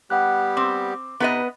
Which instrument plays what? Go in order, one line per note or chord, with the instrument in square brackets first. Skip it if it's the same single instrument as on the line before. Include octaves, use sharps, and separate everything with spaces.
[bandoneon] G3 B3 G4 [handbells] F#5 F#6
[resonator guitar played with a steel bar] C4 [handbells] D6
[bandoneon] C3 D#4 [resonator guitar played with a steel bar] B3 B4 D#5